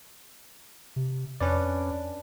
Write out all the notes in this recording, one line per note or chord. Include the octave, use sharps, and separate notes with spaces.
C3
F2 C#4 D4 B4 D5